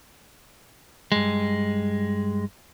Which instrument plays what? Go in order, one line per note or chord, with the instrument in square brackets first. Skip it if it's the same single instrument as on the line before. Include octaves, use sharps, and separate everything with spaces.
[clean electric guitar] G2 G#3